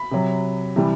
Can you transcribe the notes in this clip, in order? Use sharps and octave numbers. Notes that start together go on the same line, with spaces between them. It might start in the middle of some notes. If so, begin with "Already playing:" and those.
Already playing: B5
C3 F#3
C3 E3 G3